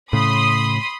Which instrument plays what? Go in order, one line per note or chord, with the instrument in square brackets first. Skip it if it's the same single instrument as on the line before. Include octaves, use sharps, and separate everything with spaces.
[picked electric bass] A2 C#3 [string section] B5 C6 D#6